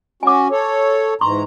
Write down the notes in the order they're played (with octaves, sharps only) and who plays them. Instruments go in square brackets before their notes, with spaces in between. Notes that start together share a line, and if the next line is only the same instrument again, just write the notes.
[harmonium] C#4 F#4 [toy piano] G#5 D6
[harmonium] A4 C#5
[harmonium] G#2 E3 A#5 [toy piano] C6 C#6